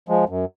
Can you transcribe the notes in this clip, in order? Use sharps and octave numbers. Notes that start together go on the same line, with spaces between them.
F3 G#3
F#2